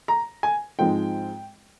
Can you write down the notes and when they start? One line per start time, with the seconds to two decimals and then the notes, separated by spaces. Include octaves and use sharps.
0.08 A#5
0.43 G#5
0.79 G#2 F3 G#3 C4 F4 G5